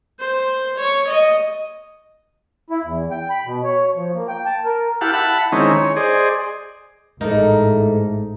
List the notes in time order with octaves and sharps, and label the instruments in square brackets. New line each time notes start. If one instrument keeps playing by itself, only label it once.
[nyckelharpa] C5
C#5 C#6
D#5
[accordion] E4
E2
G5
B5
B2
C#5
F3
A#3
G5
A5
A#4
[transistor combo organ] E4 G4 F5 F#5 A5
E5 F#5 A5 B5
D#3 G#3 C4 C#4 D#4 E4
C#5
G#4 C5 D5 D#5
[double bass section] A1 [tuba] G#2 [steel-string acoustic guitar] A#3 E4 A4 [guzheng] D#4